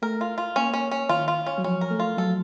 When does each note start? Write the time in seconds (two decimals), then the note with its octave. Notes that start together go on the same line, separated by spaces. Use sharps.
0.02 A3 A#4
0.21 F4
0.38 F4
0.56 A#3 C#4
0.74 C#4
0.91 C#4
1.09 D#3 F4
1.28 F4
1.46 C#4
1.58 F#3
1.64 F3 C#4
1.81 A#4
1.90 A3
1.99 F4
2.18 F#3 A4
2.26 F3